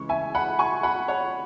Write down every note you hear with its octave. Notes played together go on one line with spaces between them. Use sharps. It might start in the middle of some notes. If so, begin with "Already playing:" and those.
Already playing: C#3 E3 G#3 C#6
E5 G#5
F#5 B5
G#5 C#6
F#5 B5
C#5 F#5